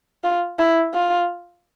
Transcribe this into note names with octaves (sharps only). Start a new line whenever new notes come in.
F4
E4
F4